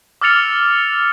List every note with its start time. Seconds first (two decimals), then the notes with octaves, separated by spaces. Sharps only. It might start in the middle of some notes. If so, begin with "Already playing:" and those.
0.21 D6 E6 F6 A6 C#7 F7